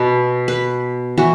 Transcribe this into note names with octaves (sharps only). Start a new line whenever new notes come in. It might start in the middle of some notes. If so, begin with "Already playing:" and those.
Already playing: B2 B3
B4
E3 F#4